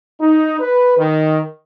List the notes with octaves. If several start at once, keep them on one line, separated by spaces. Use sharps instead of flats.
D#4
B4
D#3